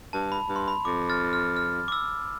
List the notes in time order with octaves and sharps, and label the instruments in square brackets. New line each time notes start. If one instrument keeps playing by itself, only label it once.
[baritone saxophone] G2 [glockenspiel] A5
[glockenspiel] B5
[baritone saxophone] G2
[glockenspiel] C6
B5
[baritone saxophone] F2 [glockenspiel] D6
[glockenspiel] F6 A6
F6
F6
D6
E6